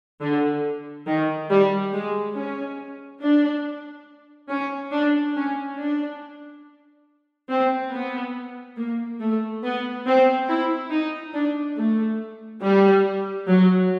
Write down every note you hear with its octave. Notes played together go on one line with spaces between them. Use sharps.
D3
D#3
G3
G#3
C#4
D4
C#4
D4
C#4
D4
C4
B3
A#3
A3
B3
C4
E4
D#4
D4
A3
G3
F#3